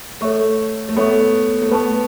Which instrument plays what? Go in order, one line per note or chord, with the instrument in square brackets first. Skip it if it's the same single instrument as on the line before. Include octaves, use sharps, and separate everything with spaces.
[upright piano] A3 [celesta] A4 C#5 E5 C#6
[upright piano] A3
[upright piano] B3 [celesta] A4 C#5 E5 C#6
[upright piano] A3
[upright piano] B3 [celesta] B4 A5 C#6